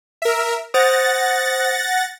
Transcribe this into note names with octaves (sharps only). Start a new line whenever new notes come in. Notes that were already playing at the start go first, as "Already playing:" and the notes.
A#4 E5
C5 F#5 D#6 A6 A#6